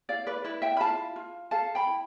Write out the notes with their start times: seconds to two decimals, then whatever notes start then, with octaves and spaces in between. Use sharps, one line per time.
0.09 E4 D5 F5
0.27 B4 D5
0.44 E4 B4
0.62 E5 G5
0.77 B5
0.80 F4 F5 A5
1.16 F4
1.51 A4 F5 A5
1.75 G5 B5
1.87 E4